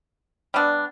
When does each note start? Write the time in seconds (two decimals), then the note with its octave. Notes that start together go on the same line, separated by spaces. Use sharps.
0.54 G3 B3 D4